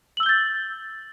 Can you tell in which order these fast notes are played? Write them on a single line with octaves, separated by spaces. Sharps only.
F#7 E6 G7 G6 A6